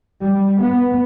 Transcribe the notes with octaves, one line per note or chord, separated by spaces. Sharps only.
G3
B3